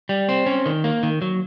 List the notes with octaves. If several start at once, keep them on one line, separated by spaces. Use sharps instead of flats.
G3
C4
C#4
D#3
A#3
D#3
F#3